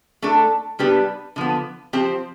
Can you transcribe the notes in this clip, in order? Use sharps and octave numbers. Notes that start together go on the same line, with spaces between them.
A3 D4 A4
G3 B3 D4 G4 B4
D3 F3 B3
F3 C4 G4 C5